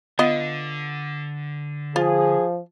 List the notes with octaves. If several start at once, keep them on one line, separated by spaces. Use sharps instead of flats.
D3 B3 F4 D#5
F3 F4 G#4